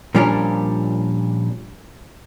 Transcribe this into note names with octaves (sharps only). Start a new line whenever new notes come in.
A#2 F3 G3 C#4 D4 A#4